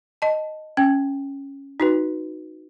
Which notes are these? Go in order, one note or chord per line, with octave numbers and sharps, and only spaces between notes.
D#5 A5
C#4 G5
D#4 F#4 B4